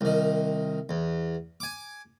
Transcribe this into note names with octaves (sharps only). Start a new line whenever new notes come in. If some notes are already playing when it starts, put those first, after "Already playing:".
C2 D#3
E2
G#5 D6